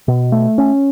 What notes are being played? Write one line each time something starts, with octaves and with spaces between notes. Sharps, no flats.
B2
A3
C#4